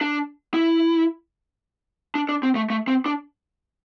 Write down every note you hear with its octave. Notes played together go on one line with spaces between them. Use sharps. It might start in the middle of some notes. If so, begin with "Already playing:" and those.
D4
E4
D4
D4
C4
A3
A3
C4
D4